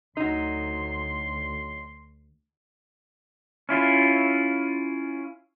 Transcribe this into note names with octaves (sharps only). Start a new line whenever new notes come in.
D2 F#3 D#4 C6
C#4 E4 F4